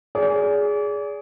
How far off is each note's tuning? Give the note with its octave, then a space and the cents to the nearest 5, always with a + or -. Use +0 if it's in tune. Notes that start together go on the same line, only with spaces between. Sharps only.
G#4 +0 D5 -35